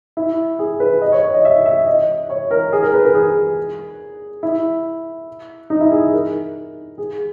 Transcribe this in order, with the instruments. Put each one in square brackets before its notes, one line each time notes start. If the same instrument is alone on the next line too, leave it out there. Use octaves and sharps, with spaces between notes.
[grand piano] E4
G#4
B4
D#5
C#5
C#5
D#5
E5
E5
D#5
C#5
A#4
G#4
A#4
B4
A#4
G#4
E4
D#4
E4
G#4
A#4
G#4